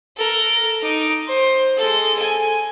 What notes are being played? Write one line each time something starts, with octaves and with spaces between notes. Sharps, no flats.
A4 A#4
D#4 D6
C5
G#3 A4
G#5